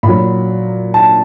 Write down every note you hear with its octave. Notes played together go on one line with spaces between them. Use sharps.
A#2 B5
F#3
A5